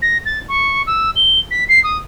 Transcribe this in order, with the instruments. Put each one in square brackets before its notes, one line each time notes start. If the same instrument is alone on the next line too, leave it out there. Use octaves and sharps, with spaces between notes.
[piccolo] A#6
A6
C#6
E6
G7
B6
C7
D#6